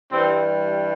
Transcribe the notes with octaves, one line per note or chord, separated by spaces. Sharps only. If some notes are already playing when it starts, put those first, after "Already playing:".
G2 E3 G3 C4